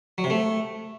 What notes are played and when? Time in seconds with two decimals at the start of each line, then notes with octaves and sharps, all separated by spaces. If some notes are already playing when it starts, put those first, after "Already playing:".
0.18 F#3
0.24 C3
0.30 A3